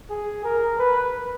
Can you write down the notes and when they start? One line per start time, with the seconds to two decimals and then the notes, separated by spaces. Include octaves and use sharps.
0.10 G#4
0.44 A#4
0.78 B4